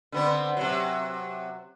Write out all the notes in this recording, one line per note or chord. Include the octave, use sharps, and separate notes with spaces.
D3 B3 C4
C3 F#3